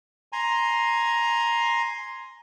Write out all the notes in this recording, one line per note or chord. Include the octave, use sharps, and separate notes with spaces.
G#5 A#5 C6